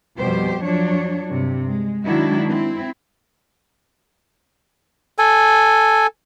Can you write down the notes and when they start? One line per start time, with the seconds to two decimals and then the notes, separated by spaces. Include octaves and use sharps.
0.18 F2 B2 G3 G4 C5
0.64 F3 F#3 D4 C#5
1.29 G2 C3
1.67 G#3
2.04 D#3 F#3 G#3 D4 E4 F#4
2.48 C4 E4
5.18 A4 G#5